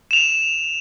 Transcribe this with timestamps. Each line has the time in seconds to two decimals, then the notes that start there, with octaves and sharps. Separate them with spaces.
0.11 E7 F7